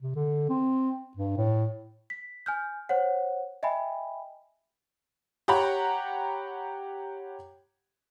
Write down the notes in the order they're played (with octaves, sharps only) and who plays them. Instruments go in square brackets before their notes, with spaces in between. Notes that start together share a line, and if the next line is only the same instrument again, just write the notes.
[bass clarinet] C3
D3
C4
G2
A2
[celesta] B6
G#5 F6 G6
C5 C#5 F#5
D#5 E5 G5 G#5 B5
[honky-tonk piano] G4 C#5 F#5 A#5 B5